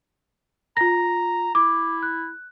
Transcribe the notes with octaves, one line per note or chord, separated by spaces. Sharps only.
F4 A#5 A#6
E4 D6
F#6